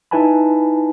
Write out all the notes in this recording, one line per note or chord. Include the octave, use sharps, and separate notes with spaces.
D#4 E4 B4 G#5 A5 B5